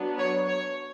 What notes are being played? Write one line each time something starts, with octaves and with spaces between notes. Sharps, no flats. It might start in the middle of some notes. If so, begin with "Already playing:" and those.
Already playing: F#3 B3 D4
C#5
C#5